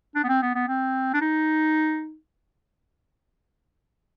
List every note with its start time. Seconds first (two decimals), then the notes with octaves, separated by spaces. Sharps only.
0.15 D4
0.24 B3
0.29 C4
0.42 B3
0.55 B3
0.68 C4
1.14 D4
1.21 D#4